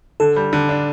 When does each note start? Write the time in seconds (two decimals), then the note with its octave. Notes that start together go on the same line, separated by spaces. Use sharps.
0.20 D3 A4
0.36 G3
0.53 D3
0.69 D4